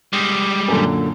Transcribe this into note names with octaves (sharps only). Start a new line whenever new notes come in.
G3 G#3
F#2 A#2 D3